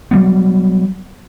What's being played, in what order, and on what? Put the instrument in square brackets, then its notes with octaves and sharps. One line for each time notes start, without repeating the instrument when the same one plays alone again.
[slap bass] F#3 G3 B3